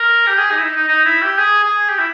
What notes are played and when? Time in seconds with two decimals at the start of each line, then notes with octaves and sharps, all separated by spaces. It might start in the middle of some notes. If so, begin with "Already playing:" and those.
Already playing: A#4
0.27 G4
0.38 G#4
0.51 D#4
0.58 E4
0.64 D#4
0.76 D#4
0.88 D#4
1.05 E4
1.22 G4
1.38 G#4
1.63 G#4
1.89 G4
1.98 E4